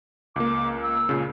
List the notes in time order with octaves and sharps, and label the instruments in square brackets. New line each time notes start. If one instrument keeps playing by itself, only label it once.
[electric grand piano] C#2 A#3 [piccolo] D6
[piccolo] E6
[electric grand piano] C#2 A#2 C#3